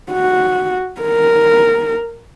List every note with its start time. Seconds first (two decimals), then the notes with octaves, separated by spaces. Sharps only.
0.12 F#4
1.01 A#4